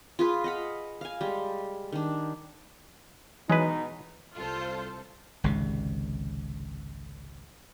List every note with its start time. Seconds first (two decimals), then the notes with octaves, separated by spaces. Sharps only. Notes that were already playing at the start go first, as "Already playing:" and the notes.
0.19 F4 G#4 B4
0.44 D#5 F5 F#5 B5
1.01 F5 G#5
1.21 G3 G#3
1.93 D#3 D4
3.50 B2 E3 F#3 G#3 D#4 B4
4.36 C2 F4 A4 C5
5.44 G#1 C#2 G#2 C3